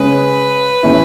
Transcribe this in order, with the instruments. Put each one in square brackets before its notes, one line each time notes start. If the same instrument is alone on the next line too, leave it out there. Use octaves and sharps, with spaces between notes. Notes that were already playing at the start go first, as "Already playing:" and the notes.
Already playing: [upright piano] C#3 G#3 C#4 [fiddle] B4
[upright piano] A2 E3 A3 C#4 E4